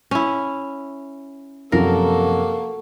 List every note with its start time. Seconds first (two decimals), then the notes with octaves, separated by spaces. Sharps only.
0.11 C#4 E4
1.72 F#2 C3 F3 A#3 F#4 A4 A#4